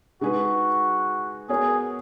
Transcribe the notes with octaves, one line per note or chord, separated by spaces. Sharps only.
G#3 D#4 F#4 G#4 B4
B3 F#4 G#4 A#4 C#5